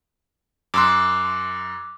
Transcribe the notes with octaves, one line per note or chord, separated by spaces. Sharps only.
F#2 C6 D6 E6 F#6